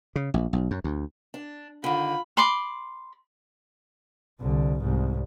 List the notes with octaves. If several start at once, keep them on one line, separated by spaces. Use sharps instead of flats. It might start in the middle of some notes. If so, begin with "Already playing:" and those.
C#3
A#1
B1
F#2
D2
D4
D3 D#3 F4 B5
B5 C6 D6
C2 D3
C2 G#2